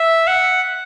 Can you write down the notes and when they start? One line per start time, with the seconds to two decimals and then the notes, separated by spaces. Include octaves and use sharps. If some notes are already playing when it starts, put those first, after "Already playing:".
Already playing: E5
0.27 F#5